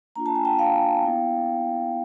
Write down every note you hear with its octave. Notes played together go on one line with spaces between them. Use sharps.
A#3 D4 F4 A#5
A5
G#5
G5 A5
F5 G5
B3 E4